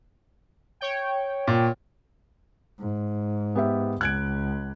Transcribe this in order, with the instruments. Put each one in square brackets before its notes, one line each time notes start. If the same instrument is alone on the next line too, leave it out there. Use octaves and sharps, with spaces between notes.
[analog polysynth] C#5 G5
[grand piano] A#2
[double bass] G#2
[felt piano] B3 G4 E5
[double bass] C#2 [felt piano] F#6 G#6 D7